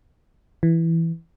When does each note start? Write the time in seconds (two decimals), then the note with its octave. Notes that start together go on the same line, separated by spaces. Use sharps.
0.63 E3